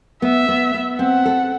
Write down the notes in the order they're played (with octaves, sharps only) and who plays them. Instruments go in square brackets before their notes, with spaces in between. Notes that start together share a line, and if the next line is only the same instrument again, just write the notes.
[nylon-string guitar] B3 [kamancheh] E5
[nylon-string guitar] B3
B3
[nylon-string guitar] C4 [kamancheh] F#5
[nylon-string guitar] A4